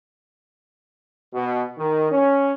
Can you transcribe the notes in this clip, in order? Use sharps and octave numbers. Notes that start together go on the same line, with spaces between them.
B2
D#3
C#4